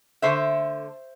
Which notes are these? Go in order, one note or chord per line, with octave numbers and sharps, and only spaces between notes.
D3 A3 C5 E5